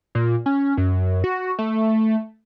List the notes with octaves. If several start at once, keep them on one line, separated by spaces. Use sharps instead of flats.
A#2
C#4
F#2
F#4
A3